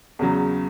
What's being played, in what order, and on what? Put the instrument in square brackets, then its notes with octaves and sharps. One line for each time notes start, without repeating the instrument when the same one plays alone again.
[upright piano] E2 C#3 F#3